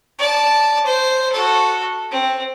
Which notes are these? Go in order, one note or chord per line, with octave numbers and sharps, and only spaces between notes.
D5 A5
C5
F#4 A4
C4